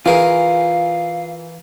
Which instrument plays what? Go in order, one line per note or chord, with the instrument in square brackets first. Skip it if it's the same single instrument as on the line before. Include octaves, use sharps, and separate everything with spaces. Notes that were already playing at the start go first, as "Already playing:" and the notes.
[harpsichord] E3 A#4 [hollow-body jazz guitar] F4 G#4 [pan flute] F5